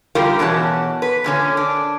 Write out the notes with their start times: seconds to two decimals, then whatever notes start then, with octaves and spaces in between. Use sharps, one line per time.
0.15 D3 G3 F4 G4 A#4
0.39 E2 B2 C#4 F#4 A5
1.02 B4
1.24 A#2 D3 C#4
1.57 D4